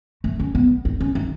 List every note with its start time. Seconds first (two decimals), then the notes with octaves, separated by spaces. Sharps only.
0.24 A3
0.39 C#4
0.55 B3
0.85 D#4
1.00 C#4
1.15 D#4